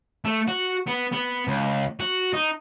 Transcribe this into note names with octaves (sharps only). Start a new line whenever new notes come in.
A3
F#4
B3
B3
C#2
F#4
D#4